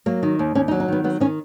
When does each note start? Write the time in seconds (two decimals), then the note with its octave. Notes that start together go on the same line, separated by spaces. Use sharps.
0.06 F#3 A#3
0.23 D#3
0.39 D#2
0.55 D#2 C#4
0.68 D#4
0.71 F#3
0.80 D#4
0.88 D#3 B3
1.04 F#3 B3
1.20 D#3 C#4